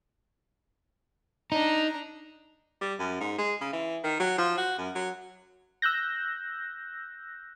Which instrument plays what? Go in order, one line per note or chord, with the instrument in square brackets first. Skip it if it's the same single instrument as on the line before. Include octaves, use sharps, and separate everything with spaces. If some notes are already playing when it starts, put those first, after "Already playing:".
[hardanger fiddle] D4 A#5 [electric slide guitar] D#4
[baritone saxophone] G3
F#2
G#2
G#3
C#3
E3
D#3
F#3
F3
F#4
F#2
F#3
[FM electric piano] E6 F#6 G6 A#6